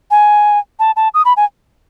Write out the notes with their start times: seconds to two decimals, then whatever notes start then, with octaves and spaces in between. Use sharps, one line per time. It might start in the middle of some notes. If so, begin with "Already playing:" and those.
0.11 G#5
0.79 A5
0.96 A5
1.14 D#6
1.25 B5
1.37 G#5